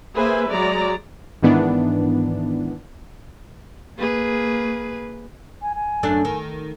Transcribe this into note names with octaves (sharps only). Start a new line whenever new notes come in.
A#3 G#4 B4 C5 E5 G#5
F#3 G#3 D5 A#5
G#2 D#3 E3 B3 D4
A#3 G#4 B4
G#5
G#5
F#2 A3 D4
D#3